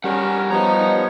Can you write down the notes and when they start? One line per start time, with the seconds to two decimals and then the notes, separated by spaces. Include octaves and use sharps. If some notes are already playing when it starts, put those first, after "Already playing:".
0.04 G3 C#4 G4 A#4 F#5
0.51 F3 B3 C#5 D#5 A#5